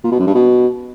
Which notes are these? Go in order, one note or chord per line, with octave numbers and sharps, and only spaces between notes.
A#2
B2
F#2
G2
B2